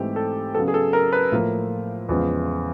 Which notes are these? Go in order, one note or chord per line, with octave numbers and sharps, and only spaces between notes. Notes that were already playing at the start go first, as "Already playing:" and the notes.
Already playing: G#2 E3 A3 C4 G4
A4
C#3 F#3 B3 A4
G#4
A4
A#4
B4
A2 F3 A#3
E2 C#3 F3 G#3 B3